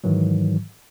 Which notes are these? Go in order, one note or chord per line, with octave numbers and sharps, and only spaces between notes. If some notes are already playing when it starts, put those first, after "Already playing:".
G#2 D#3 E3 F#3